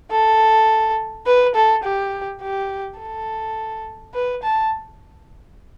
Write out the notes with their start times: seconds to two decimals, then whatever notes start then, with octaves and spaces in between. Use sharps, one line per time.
0.12 A4
1.27 B4
1.55 A4
1.84 G4
2.42 G4
3.00 A4
4.14 B4
4.43 A5